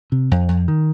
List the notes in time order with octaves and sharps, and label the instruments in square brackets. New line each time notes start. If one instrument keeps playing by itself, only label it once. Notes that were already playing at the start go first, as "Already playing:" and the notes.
[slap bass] C3
F2
F2
D#3